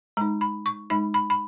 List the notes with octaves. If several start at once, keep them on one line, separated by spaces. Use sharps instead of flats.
G#3 D#4 A#5
B5
C#6
G#3 D#4 B5
B5
B5